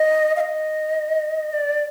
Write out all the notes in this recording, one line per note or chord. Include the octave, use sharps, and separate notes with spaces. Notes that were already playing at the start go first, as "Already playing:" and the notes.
Already playing: D#5
F5
D#5
D5